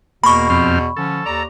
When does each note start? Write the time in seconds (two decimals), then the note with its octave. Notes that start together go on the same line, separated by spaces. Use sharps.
0.24 E2 B2 A#3 B5 C#6
0.50 F2 C4 F6
0.97 D3 F3 C#4 A4
1.26 D#2 D5 A#5